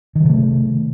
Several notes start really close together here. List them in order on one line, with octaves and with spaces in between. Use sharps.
D#3 F#3 C3 A3